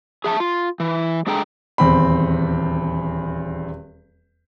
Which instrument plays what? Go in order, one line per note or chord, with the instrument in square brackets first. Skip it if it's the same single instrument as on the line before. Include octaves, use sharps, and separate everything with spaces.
[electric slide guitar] G#4 E5 G#5 A5
F4
E3
G#3 D4 G#4 A4 G5 A#5
[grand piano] D#1 E2 C4 B5